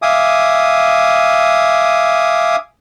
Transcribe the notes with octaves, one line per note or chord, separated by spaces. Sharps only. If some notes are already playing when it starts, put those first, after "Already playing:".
E5 F5 G#5 D6 D#6